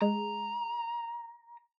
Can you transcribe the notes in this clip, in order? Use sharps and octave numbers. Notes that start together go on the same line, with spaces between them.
G#3 A#5